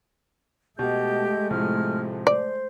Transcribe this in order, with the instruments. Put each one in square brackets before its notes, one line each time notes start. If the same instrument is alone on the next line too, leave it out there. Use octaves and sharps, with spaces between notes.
[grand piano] B2 [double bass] G#3 A3 [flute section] G4 D#5 G6
[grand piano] A2 C3 F3 [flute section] F6
[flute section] C5 [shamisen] D5